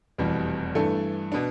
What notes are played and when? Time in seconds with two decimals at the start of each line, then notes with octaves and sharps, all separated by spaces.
0.18 F1 E2 B2 G3
0.75 G2 E3 A3 D4 A4
1.32 B2 B3 D4